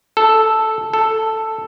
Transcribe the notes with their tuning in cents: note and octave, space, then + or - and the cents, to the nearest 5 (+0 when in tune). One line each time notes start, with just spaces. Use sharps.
A4 +0
A4 +5